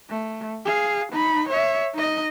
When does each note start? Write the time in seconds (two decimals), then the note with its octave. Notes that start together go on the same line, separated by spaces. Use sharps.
0.10 A3
0.65 G#4 F5
1.12 D#4 B5
1.49 C#5 E5
1.94 D#4 D#5